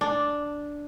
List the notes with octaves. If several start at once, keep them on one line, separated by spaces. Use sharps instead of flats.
D4